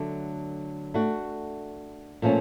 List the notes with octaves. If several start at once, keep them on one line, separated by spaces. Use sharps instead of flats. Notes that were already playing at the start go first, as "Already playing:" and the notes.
Already playing: D3 F#3 A3
A3 D4 F#4
A#2 F3 A3 C#4